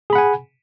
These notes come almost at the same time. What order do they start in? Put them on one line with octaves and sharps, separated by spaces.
G#4 B5 F#5 G#5